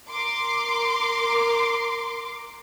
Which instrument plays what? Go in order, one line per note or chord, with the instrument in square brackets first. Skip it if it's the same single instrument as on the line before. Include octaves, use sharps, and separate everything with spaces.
[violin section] A#4 C6 D6